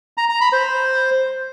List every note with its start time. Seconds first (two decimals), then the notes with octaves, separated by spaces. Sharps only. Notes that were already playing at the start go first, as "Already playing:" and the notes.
0.17 A#5
0.29 A#5
0.41 B5
0.53 C5